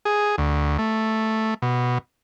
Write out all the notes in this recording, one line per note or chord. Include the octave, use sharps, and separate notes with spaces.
G#4
D2
A3
B2